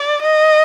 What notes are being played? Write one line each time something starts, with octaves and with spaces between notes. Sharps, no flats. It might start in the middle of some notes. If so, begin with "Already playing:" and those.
Already playing: D5
D#5